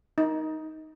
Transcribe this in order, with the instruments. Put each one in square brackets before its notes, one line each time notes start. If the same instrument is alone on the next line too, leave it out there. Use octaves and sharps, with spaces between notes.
[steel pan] D#4